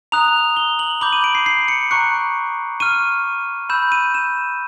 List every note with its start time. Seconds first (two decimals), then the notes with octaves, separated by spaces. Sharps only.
0.12 A#5 D#6 F#6 F7
0.57 G7
0.79 F#7
1.01 B5 D6 G6 F#7
1.13 D#7
1.24 D7
1.35 C7
1.46 C7
1.68 C#7
1.91 A#5 C#6 F#6 C#7
2.80 C#6 F6 D#7
3.69 B5 E6 G6 E7
3.92 D#7
4.14 E7